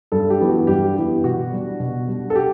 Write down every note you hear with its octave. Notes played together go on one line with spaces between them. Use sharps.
G2 A4
G4
E3 B3 E4
F#4
G2 G4
E3 B3 E4 G4
B2 F#4
G3 D4
B2
G3 D4
A4
G4